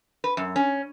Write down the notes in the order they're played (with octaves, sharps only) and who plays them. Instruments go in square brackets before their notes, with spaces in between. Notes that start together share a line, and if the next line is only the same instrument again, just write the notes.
[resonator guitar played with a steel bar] B4
F#2
C#4